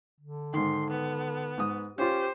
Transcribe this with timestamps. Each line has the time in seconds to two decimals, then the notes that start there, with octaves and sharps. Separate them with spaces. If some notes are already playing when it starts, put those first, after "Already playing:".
0.21 D3
0.53 G#2 D#3 C6
0.90 B3
1.58 G#2 D#6
1.98 C#4 F4 G4 C5